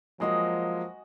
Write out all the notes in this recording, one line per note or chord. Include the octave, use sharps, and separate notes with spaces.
F3 F#3 G#3 A#3 F#4 D#5 G#5